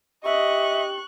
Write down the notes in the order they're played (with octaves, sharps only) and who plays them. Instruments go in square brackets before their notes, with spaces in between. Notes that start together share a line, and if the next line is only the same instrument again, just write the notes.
[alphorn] G4 [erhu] D#5 [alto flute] E5 [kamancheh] C#6 F#6